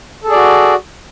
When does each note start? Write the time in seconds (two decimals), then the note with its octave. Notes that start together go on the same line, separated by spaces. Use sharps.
0.24 A4
0.28 G#4
0.32 D5
0.35 F#4